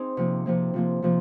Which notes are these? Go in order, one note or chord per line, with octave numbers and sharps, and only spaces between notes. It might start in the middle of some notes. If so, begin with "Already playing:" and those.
Already playing: C4 D#4 G#4
C3 F3 A#3
C3 F3 A#3
C3 F3 A#3
C3 F3 A#3